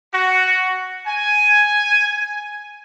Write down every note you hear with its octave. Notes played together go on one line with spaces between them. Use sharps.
F#4
G#5